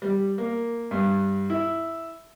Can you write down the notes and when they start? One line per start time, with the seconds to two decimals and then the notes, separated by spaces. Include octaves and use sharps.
0.02 G3
0.38 A#3
0.91 G2
1.50 E4